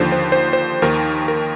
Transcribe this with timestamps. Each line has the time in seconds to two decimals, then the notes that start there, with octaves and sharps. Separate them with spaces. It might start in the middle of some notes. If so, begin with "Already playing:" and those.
Already playing: D#2 D3 F3 C5
0.12 C5
0.32 C5
0.53 C5
0.82 D#2 D#3 A#4
1.28 A#4